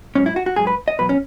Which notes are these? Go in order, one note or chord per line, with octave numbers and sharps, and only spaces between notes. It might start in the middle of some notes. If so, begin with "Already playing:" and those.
G#2 F#3 C#4
E4
F#4
F#4
G#2 F#3 G#4
B4
D#5
E2 B2 F#3 B4
C#4